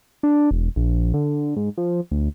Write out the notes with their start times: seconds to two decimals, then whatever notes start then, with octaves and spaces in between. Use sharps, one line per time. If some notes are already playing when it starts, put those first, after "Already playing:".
0.23 D4
0.51 E1
0.76 A#1
1.14 D3
1.56 G#2
1.78 F3
2.11 D2